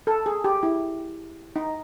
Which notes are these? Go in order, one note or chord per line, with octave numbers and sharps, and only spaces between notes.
A4
G#4
G4
E4
D#4